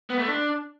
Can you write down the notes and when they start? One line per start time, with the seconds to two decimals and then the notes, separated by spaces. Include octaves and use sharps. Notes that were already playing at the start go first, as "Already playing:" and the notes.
0.10 B3
0.19 A3
0.28 D4